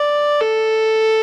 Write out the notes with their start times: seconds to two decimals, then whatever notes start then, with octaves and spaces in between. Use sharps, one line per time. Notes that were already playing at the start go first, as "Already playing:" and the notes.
Already playing: D5
0.41 A4